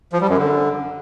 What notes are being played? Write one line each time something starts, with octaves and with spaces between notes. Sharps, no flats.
F3
G3
F#2
D3